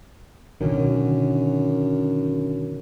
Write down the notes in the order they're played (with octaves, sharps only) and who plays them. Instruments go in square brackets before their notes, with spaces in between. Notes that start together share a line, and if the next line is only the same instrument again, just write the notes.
[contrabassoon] F#2 [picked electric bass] B2 D3 D#3